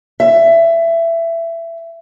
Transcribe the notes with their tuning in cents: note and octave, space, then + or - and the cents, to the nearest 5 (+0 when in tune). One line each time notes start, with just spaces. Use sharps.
E5 +20